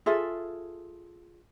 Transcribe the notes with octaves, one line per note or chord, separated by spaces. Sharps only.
F4 G#4 A4 E5